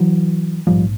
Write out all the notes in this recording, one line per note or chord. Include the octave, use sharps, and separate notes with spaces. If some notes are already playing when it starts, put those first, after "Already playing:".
Already playing: E3 F#3
A#1 G#2 F3 G3